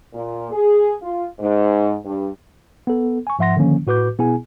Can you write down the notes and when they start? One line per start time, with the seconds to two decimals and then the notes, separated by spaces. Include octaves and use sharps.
0.14 A#2
0.51 G#4
1.02 F4
1.40 G#2
2.04 G2
2.87 B3 A4
3.27 G#5 C#6
3.39 G#2 F3 E5 F#5 C6 A#6
3.56 D3 D#3 F3 A#3 C#4
3.87 A2 F#4 B4 D6 G6
4.19 B2 B3 E4 G#4 G#5